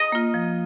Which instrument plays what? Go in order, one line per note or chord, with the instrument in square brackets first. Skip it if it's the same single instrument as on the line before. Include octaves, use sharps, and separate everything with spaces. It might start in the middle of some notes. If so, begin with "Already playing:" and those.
Already playing: [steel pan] D#5
[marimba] A#3 F4
F3